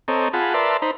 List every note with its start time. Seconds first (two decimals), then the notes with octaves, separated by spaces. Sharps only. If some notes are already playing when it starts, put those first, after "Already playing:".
0.08 C4 A4 C#5 D#5 A#5
0.33 F4 G#4 F#5 A5 B5
0.54 A#4 B4 D5 E5 A5 C6
0.82 D#4 C5 A#5 B5